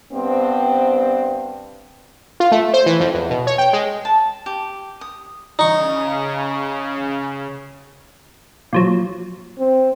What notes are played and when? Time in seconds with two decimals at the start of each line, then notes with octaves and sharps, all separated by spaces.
0.13 G2 B3 C4
2.40 F4
2.52 A3
2.73 C5
2.86 E3
3.00 F2
3.14 E2
3.30 B2
3.47 C#5
3.58 G5
3.73 G#3
4.05 A5
4.46 G4
5.01 D#6
5.59 C#3 D#4 C#6
8.73 A#2 F3 F#3
9.59 C4